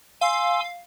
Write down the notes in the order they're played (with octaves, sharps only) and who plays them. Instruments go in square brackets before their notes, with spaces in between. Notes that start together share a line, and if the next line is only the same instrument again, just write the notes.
[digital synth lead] F5 [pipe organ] G#5 C6 E6